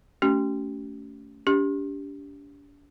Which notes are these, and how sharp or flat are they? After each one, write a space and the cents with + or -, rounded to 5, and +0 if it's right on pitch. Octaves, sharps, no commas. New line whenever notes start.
A3 +0 C#4 +25 G4 -40
D4 -40 G4 +5